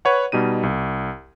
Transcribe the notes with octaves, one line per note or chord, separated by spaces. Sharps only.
B4 C#5 F#5
B2 G3 D#4 D#7
C2